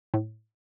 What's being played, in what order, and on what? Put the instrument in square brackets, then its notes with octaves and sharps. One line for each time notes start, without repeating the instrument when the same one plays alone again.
[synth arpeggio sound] A2